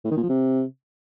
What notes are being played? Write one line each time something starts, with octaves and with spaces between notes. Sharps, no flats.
A2
D#3
A#2
F3
C3